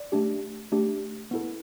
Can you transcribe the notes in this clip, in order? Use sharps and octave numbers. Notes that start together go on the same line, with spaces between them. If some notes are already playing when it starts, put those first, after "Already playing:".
Already playing: D5
A3 D4 G4
A3 D4 G4
B3 E4 A4